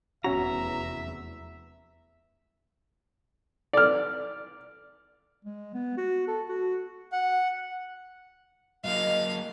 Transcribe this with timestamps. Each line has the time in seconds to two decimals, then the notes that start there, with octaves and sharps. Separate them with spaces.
0.24 F1 E2 C#4 F#4 E5 A#5
3.73 D5 F6
5.45 G#3
5.74 B3
5.97 F#4
6.28 A4
6.49 F#4
7.12 F#5
8.85 F#3 A#3 D#5 F5